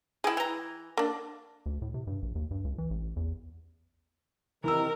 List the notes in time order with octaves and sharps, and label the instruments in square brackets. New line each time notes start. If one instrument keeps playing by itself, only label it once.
[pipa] G#3 E4 [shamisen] G#4 G5
[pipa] E3 A#5
[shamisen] A#3 D4
[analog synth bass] D2
A2
C3
G2
A#1
D#2
G2
C#2
E3
A1
E2
[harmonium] C3 D#3 [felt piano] E3 E6 [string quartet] A#4